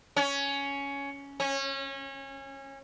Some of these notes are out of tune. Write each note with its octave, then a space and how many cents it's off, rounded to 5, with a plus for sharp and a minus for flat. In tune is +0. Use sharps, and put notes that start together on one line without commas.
C#4 +10
C#4 -25